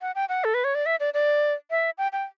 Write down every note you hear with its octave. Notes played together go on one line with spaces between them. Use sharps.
F#5
G5
F#5
A4
B4
C#5
D5
E5
D5
D5
E5
G5
G5